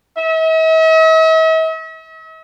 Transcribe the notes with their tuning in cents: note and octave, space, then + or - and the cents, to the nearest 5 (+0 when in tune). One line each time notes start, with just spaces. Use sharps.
E5 -45